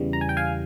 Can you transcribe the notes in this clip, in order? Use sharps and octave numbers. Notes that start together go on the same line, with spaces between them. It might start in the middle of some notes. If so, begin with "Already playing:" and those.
Already playing: E2 C#3 E3 G3
A#5
G#5
G5
F5 G#5